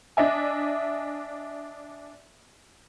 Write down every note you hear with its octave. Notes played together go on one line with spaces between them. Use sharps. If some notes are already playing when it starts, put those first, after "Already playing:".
D4 D#5 E5 G#5